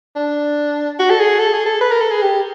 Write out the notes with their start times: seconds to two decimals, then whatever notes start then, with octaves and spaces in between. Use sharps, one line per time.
0.16 D4
0.99 F#4
1.10 A4
1.19 G#4
1.39 A4
1.53 G#4
1.66 A4
1.81 B4
1.91 A#4
2.01 A4
2.11 G#4
2.22 G4